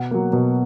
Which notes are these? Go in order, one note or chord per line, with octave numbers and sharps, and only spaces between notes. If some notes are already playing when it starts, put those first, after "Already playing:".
Already playing: B2 F#5
F#3 A#3
B2